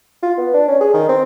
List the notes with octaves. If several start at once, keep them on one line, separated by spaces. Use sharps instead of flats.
F4
B3
D4
C#4
G#4
D#3
C4